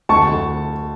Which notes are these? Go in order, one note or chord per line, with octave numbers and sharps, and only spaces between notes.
D2 A5 C#6
D2